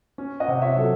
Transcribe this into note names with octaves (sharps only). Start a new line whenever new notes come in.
C#4
D#5 F#5
C3
C#5 E5
F#3 A4